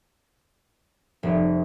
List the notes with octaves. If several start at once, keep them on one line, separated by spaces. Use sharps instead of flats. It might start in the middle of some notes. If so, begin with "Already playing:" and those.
F1